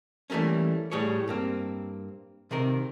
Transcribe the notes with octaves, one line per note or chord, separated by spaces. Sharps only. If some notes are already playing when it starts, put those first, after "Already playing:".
E3 G3 A3 A#3 C#4
A2 G3 G#4 C#5
G2 A#3 C4
C3 D#3 C4 A#4